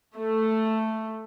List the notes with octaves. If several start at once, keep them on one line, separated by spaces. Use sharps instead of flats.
A3